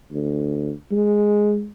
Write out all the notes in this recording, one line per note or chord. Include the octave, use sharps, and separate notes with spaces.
D2
G#3